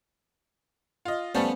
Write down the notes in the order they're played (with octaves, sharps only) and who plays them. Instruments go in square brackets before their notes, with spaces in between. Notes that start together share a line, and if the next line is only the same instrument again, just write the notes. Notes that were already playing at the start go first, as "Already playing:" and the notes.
[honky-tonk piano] F4 D#5
[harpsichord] F3 B3 C#4 [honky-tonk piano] G3 A3 A4